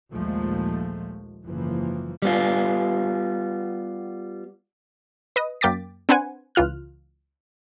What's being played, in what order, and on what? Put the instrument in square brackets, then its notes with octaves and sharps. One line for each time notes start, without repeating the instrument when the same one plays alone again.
[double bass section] A#1 D#2 A#2 F3 G#3 A3
F#1 G#2 E3 F3 A#3
[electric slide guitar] G3 B3 F4
[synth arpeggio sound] B4 D#5 D#6
F#2 A#3 G5 D6 A6 B6
C4 D4 B4 C5 F#5 G#5
C#2 E3 F4 F6 F#6